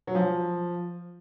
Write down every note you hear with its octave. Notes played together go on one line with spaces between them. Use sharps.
F#3
F3